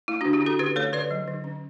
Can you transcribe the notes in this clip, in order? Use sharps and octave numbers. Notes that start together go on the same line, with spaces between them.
A3 E4
D3 D4 F#4
E4 G4
C#4 F#4 A4
D3 G4 B4
A3 A4 C#5
D3 B4 D5
F#3
D3
C#4